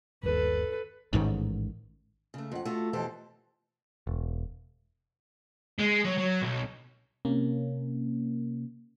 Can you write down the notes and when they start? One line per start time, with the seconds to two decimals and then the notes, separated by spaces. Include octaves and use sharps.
0.23 G1 D#2 A4 B4
1.13 A1 G#2 D3 D#3
2.34 C#3 A3
2.52 F2 F#5
2.65 A3 F4 F#4
2.93 F2 B2 E3 G4 A4 C5
4.07 E1
5.79 G#3
6.05 F#3
6.18 F#3
6.42 B1
7.25 C3 A#3 C#4